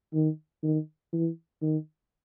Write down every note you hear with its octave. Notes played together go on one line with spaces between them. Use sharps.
D#3
D#3
E3
D#3